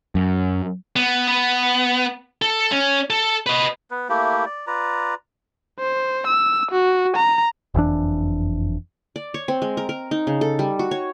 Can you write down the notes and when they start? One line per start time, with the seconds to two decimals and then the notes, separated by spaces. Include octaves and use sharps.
0.15 F#2
0.96 B3
1.28 B3
2.42 A4
2.72 C#4
3.10 A4
3.47 B4 D#5
3.91 B3 B4
4.09 A3 A#3 E4 G4
4.46 D5
4.67 F4 B4 D5 A#5
5.80 C5
6.27 E6
6.71 F#4
7.16 A#5
7.74 F#1 F2 E3 D4
9.16 D5
9.34 C#5
9.48 C4
9.62 G#3
9.77 A#4
9.89 A#4
10.11 D#4
10.27 C#3
10.41 A4
10.59 G3
10.79 F#4
10.91 C#5